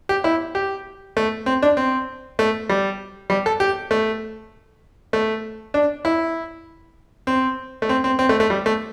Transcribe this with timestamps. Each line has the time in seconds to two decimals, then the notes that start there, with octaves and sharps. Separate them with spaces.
0.09 G4
0.24 E4
0.55 G4
1.17 A3
1.46 C4
1.62 D4
1.77 C4
2.39 A3
2.70 G3
3.30 G3
3.46 A4
3.60 G4
3.91 A3
5.13 A3
5.74 D4
6.05 E4
7.27 C4
7.82 A3
7.89 C4
8.04 C4
8.19 C4
8.29 A3
8.40 A3
8.50 G3
8.66 A3